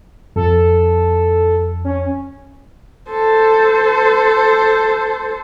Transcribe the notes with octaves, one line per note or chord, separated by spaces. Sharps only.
F2 A4
C#4
A4 C5